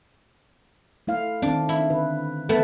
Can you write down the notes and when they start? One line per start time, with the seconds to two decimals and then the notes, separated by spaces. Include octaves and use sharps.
1.07 A3 E4 F5
1.42 D#3 C4 D4
1.69 E4
1.90 D3 B4
2.49 A3 B3 A4